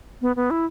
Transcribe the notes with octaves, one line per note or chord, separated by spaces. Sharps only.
B3
B3
E4